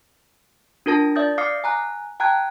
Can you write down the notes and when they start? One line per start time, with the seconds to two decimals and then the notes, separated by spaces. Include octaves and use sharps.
0.86 D4 F4 A#4 A5 A#6
1.15 D5 E5 D#6 G6 A6
1.38 F5 D6 D#6 F6 C7 C#7
1.64 G#5 A#5 F#6
2.20 G5 A5 A#5 F#6 G#6